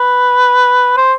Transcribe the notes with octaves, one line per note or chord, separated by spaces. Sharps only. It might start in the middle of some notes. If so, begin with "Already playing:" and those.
Already playing: B4
C5